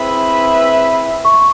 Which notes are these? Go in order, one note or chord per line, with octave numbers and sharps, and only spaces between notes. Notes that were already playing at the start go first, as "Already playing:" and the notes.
Already playing: C4 E4 G#4 B4 E5
C#6
C6